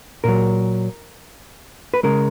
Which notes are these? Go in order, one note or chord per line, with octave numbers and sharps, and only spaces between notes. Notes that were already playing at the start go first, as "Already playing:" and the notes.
A#2 F#3 A#4
B4
C#3 G#3 A#4